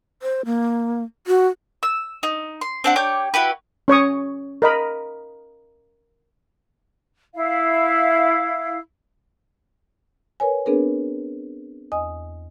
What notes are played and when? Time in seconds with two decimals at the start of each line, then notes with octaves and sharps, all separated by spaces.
0.22 C5
0.45 A#3
1.27 F#4
1.83 E6
2.23 D#4
2.61 C6
2.84 C4 D4 F#5
2.96 G4 C#5 D6 G6
3.34 E4 F#4 G4 B4
3.88 C#4 C#5 C#6 D#6
4.62 A#4 D#5 B5
7.35 E4 F5
10.40 A#4 B4 C#5 G#5
10.66 B3 C4 D4 G#4 A#4 B4
11.92 E2 D#5 G#5 D#6